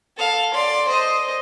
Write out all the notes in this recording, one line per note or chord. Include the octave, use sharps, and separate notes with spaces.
A4 F5
D5 C6
C5 D#5